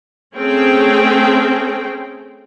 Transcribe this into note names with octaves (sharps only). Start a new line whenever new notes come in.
A3 C4 C#4 G#4 C5 G5